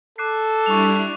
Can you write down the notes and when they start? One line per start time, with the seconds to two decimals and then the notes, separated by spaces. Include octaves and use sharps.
0.18 A4 D6 F#6 C7
0.66 G3 D4 E4 C#6 F7